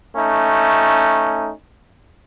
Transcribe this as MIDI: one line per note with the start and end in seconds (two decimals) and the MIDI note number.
0.16 1.52 57
0.16 1.52 61
0.16 1.52 63